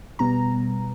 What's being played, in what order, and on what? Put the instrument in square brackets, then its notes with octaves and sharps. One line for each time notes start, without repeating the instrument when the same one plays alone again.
[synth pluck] B2 G3 B3 A#5